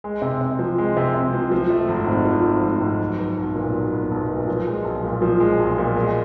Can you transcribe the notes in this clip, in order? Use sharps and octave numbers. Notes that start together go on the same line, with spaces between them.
G#3
C3
C3
F3
G#3
C3
C3
F3
F3
A3
G#1
G#2
F3
A3
G#1
G#2
F#3
B3
B1
A#2
F#3
B3
B1
A#2
F3
G#3
B1
A#2
F3
G#3
B1
A#2
G#3